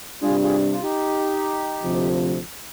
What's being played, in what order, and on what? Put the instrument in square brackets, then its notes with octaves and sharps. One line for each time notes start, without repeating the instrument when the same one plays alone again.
[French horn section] C3 G3 D4 [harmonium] F4 G#4
[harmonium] F4 G#4
F4
D#4 G4
[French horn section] D2 C3 F3